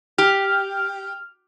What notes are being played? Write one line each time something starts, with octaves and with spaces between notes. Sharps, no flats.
G4 F6